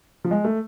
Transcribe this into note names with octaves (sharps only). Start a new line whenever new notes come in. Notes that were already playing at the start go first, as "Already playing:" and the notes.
F3
G#3
A3